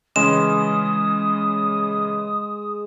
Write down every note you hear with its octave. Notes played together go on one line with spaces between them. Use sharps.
C#3 E3 G#3 C#4 D#6 E7